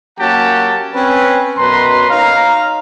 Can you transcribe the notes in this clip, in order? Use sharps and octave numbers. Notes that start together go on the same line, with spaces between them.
F#3 A#3 C#4 G4 F#5 A5
C4 C#4 B4
F#2 B2 B4 A#5 C6
D#4 C#5 F5 A#5